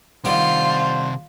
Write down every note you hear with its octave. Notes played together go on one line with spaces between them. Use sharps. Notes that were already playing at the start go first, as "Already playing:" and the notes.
G2 C3 D#3 F4 C5 D5 F#5